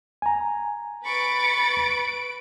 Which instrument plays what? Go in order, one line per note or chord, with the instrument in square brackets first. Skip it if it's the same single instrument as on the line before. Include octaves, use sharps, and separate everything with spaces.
[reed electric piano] G#5 A#5
[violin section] B4 D7 [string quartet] B5 C#6 A6